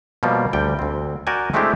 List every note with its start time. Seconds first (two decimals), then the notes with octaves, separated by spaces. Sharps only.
0.23 B2 F3 G3 A#3
0.53 D2 G3 G5
0.79 D2 C4
1.27 F#4 A#4 D5 G5 G#5
1.54 G#3 A3 C4 D4 E4 G4